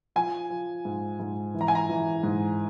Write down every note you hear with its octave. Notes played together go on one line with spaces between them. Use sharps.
F3 G#5
F3
G#2
G#2
E3
A#5
G#5
A#5
E3
G#2